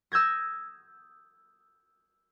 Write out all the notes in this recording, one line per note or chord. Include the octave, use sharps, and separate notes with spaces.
D#6 E6 G6 G#6 A#6